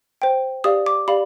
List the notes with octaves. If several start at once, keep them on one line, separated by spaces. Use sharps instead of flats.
C5 G5
G4 D5 F5 D#6
D6
G4 D5 F5 B5